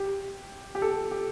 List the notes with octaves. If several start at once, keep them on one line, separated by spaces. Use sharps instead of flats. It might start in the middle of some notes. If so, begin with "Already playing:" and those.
Already playing: G4
G4
A4
G4